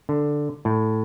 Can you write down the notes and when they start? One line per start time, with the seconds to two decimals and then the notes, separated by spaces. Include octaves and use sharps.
0.09 D3
0.65 A2